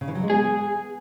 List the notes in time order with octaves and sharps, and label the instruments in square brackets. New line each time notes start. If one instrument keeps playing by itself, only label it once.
[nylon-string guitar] C#3
E3
F#3
G#3
[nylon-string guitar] B3 [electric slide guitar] G#4